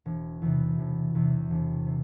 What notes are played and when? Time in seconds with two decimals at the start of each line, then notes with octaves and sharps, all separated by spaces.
0.06 E1
0.42 E2 C3
0.78 E1
1.15 E2 C3
1.51 E1
1.87 C3